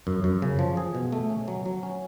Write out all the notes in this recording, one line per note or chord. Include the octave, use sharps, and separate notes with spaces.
F#2
F#2
C#3
F3
G#4
B2
A3
C#4
F#3
F#3
C#4